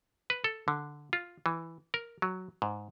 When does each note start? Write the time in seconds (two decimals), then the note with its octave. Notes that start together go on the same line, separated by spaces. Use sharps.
0.30 B4
0.44 A4
0.68 D3
1.13 F4
1.46 E3
1.94 A#4
2.22 F#3
2.62 G#2